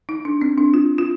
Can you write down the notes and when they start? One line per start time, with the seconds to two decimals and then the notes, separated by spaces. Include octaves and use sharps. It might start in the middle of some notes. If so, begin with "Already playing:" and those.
0.09 D#4
0.25 D4
0.41 C4
0.58 D4
0.74 F4
0.98 F4